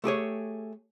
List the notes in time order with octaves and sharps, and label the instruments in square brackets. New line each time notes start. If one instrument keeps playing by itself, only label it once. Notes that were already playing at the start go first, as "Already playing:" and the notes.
[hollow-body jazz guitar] A3 G4 G#4 C#5